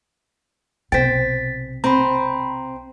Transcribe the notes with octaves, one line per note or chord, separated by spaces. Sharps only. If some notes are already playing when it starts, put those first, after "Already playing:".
B1 C3 C5 G5 A6 B6
C4 A#5 B5